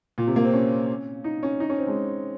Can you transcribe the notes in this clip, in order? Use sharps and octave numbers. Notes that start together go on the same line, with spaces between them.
A#2
C3
A#3
C4
C#4
D#4
C#4
D#4
C#4
C4
G#3